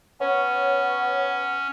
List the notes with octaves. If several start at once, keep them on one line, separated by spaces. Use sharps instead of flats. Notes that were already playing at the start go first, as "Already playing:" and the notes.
B3 C#4 C#5